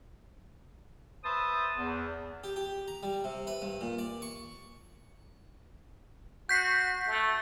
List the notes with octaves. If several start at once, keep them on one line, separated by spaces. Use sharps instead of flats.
B4 C5 E5 A5 D#6
E2
G4
G4
A#5
G3
C3
B4
G2
A#2
D5
C#6
F#4 G6 B6 C7
A3